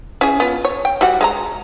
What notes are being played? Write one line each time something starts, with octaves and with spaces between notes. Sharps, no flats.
C#4 E4 G#4
B3 F4
C#5
G5
G3 F#4 F#5
G#3 G#4 A#5